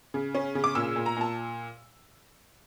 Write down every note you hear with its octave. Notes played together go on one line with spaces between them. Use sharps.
C#3
C#4
C#3
D6
A#2 E6
A#2
A#5
A#2 A5